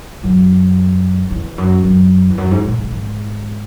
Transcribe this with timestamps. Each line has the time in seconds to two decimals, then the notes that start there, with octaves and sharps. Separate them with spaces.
0.24 F#2
1.31 E2
1.58 F#2
1.84 F#2
2.30 E2
2.38 F#2
2.51 G#2
2.64 A#2
2.78 G#2
2.91 G#2